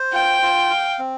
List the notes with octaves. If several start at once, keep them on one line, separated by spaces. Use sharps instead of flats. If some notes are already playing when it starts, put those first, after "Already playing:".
Already playing: C5
F4 G5
F4
F5
C4